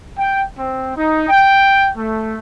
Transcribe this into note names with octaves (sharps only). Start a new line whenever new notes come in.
G5
C4
D#4
G5
A3